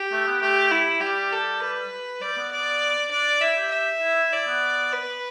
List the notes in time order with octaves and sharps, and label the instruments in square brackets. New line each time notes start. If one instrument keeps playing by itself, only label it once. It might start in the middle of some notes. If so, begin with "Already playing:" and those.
Already playing: [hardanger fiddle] G4
[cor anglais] A3
B3
[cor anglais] A3 [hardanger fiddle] G4
[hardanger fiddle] E4
[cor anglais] G3 [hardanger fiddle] G4
[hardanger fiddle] A4
B4
[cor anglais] G3 [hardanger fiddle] D5
[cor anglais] B3
[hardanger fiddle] D5
[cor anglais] D4 [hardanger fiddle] D5
[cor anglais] E4 [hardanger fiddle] E5
[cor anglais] G4
[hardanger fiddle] E5
[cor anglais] E4
[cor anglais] E4 [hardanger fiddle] D5
[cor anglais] B3
[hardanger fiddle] B4